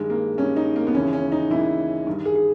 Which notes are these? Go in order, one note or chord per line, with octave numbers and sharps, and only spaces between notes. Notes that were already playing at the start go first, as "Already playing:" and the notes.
Already playing: G2 D#3 G#3
A#3
G2 D#3 C#4
D#4
A#3
B3
D#2 C#3 E3 C#4
C#4
D#4
D#2 C#3 E3 E4
G2 D#3
G#4
G#4